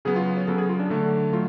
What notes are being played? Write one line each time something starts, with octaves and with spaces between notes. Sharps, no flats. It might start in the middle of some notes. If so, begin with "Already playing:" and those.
C#3 F#3 B3 G#4
F4
F4
C#5
C#3 F#3 B3 A4
G#4
F4
D4
D3 F#3 A3
F#3 A3 F4